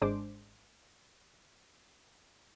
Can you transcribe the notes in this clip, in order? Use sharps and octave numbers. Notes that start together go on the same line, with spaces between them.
G#1 G#3 D4 C5 D6